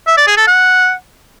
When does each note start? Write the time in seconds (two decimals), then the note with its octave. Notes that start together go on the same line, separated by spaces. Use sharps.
0.07 E5
0.17 D5
0.27 G#4
0.37 A4
0.47 F#5